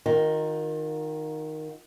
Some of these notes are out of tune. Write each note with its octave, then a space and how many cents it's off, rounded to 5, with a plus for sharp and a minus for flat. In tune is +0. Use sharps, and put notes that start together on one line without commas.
D#3 +0 F4 +45